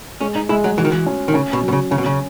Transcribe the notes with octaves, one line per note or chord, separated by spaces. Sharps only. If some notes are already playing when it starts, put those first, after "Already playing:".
G#3 C#4
D#4
G#3 E4
F#3
E3 F#4
D#3
E3
C#4
D#3
C#3 C#4
B2
F#3
B2
C#3
C#3 C#4
B2
C#3